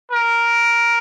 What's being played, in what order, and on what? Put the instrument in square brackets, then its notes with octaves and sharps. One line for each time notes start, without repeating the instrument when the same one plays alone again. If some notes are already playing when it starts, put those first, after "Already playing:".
[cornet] A#4